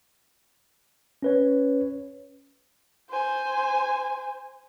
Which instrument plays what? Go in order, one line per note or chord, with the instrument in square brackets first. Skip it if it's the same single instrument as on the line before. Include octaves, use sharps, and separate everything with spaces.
[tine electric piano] C#4 B4 C#5
[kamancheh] C5 G#5